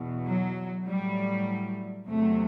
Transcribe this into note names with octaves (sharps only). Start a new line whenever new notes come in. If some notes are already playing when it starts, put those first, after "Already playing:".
Already playing: E2 B2
F#3
A2 F#3 G3
E2 C3 F#3 A3